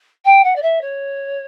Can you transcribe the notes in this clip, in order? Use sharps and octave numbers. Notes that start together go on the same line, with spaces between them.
G5
F#5
D5
E5
C#5